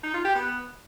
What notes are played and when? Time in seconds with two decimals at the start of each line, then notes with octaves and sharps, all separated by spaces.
0.03 D#4
0.14 F4
0.24 G4
0.35 B3